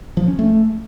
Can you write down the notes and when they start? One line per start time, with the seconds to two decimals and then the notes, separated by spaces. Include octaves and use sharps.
0.17 F3
0.28 C#4
0.39 A3